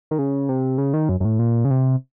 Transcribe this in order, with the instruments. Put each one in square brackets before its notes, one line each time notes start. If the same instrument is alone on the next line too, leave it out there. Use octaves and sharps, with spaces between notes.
[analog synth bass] D#3
C#3
C3
C#3
D#3
F#2
F#2
A2
A#2
C#3
C3